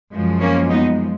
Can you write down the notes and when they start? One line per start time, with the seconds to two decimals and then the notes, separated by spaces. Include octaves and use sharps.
0.13 F#2 F3 G#3
0.41 A#3 C#4
0.70 B3 D#4